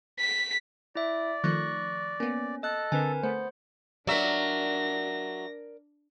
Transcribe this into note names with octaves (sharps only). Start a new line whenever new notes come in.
B6
E4 D5 E5
D#3 F3 A3 C#6 F#6 A#6
A#3 B3 C#4
A4 D#5 F#6
D3 C4 A#4 B4 G#5
A3 B3 C5
F#3 D4 A#4 D5 E5 A#6